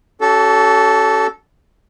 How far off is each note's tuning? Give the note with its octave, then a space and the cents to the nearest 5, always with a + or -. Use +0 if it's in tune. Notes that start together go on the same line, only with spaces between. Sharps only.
C#4 +30 F#4 +45 A4 -5